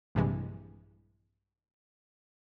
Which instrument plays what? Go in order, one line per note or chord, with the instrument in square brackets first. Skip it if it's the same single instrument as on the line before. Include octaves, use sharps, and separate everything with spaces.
[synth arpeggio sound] A#1 G2 C3 E3 G#3